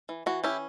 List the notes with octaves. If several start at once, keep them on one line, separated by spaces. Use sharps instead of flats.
E3
E3 F#4
C#4 E4 G4